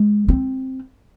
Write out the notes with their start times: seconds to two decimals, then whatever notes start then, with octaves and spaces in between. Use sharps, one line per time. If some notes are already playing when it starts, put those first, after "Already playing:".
Already playing: G#3
0.28 C4